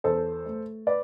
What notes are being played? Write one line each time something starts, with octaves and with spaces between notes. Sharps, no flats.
E2 A4 C5
A3
B4 D5